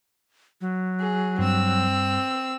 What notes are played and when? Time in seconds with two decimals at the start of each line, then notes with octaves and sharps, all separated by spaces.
0.61 F#3
1.00 G#4
1.39 G2 G3 C4 E6